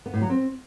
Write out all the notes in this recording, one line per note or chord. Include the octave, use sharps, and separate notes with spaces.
B3
A2
F#3
C4